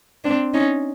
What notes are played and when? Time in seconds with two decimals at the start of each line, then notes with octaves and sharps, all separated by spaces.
0.24 C4 D4
0.54 C#4 D#4